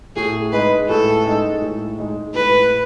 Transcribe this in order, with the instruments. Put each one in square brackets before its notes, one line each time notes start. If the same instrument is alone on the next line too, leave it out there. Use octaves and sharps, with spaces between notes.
[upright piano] A2 [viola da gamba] G#4
[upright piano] G#3 D#4 [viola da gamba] B4
[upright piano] A2 [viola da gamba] A4
[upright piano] G#3 D#4
A2
G#3 D#4
[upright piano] A2 [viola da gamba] B4